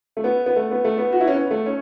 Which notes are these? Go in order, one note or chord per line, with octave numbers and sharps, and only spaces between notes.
A3
B3
B3
A3
B3
A3
B3
F#4
E4
C#4
B3
A3
C#4